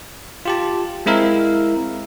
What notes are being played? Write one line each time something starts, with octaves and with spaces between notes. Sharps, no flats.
F4 G4 A5
G#3 C4 E4 A#4 E5 F5